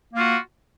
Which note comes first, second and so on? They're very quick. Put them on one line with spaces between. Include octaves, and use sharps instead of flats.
A#3 F4 F#4